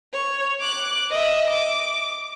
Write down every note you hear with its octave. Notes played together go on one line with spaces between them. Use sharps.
C#5
D6 F#6
D#5 E5
D6